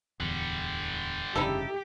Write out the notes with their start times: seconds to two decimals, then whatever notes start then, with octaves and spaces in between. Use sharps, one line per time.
0.20 D1 E2 D3 G3
1.36 F1 G2 C#3 D#4 E4 G4 A4